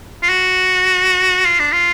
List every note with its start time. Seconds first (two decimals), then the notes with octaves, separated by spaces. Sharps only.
0.23 F4
0.29 F#4
1.46 F4
1.60 D4
1.72 F4